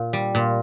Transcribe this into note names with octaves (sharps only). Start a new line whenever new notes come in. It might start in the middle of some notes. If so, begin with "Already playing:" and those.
Already playing: A#2
G3
A#2